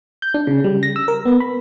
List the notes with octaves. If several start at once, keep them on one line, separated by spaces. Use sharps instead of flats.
G6
D4
C#3
G3
A#6
E6
A#4
B3
B5